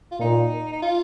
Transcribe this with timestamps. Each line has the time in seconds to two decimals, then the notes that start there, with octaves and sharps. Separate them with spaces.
0.11 F4
0.20 A#2 D#4
0.72 D#4
0.82 F4